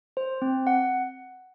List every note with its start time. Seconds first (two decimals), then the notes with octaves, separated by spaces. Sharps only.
0.17 C5
0.42 C4
0.67 F#5